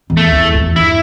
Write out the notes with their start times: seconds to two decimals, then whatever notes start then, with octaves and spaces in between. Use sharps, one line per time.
0.10 E2
0.17 A3
0.32 E2
0.54 E2
0.76 G2 E4